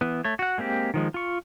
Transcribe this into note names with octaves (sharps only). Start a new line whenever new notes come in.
E3 B3
A3 C#5
F#4 F#5
G#3 A#3 C4 G4
D#3 F3 G#3
F4 C#6